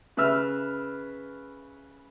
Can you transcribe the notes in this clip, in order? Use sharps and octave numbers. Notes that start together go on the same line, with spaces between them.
C#3 B4 E5 E6 F6